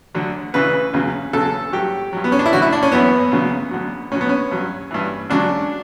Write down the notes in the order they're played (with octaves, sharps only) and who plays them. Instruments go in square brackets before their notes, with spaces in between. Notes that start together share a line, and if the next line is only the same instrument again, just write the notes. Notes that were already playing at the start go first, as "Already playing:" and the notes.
[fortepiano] D2 D3 F#3
D2 C#3 E3 B4
E2 C#3 F#3
E2 C#3 F#3 A4
G2 F#3 G4
G2 F#3
B3
C#4
D4
E4
D2 D3 F#3 F#4
E4
D4
C#4
F#2 E3 B3
D2 C#3 F#3
D2 D3 F#3
D2 D3 F#3 C#4
B3
C#4
G2 F#3
G2 E3
C#2 C#3 F#3 D4